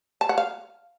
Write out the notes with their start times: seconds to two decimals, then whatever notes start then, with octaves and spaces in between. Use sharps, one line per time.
0.21 A5
0.29 F#5
0.38 F5